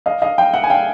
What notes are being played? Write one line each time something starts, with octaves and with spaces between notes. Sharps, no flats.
D#5 F5
D#5 F5
F5 G5
E5 F#5
G#5
F5 G5